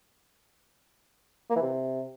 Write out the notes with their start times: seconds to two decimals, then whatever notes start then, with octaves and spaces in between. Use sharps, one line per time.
1.50 A#3
1.56 E3
1.62 C3